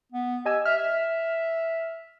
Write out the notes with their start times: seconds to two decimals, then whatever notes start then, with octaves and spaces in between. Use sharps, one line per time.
0.12 B3
0.46 G4 D#5 G#5 E6
0.66 E5 F6
0.78 E5